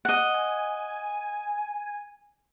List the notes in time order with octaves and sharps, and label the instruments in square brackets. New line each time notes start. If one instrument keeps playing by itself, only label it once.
[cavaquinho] D#5 F#5
[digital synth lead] G#5